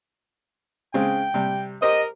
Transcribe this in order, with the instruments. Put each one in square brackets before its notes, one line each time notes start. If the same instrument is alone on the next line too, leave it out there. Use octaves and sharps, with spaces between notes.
[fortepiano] C#3 G#3 C4 [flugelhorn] G5
[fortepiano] C3 G3
[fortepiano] G4 C5 [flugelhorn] A#4 [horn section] D#5